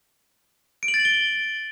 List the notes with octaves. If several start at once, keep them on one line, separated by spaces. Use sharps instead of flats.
D7
F#7
A6
F#7
G7